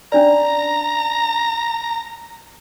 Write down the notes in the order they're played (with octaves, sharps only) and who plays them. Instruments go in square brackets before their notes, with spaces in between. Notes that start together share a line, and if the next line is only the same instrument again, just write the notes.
[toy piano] C#4 D4 D5 [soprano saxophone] A#5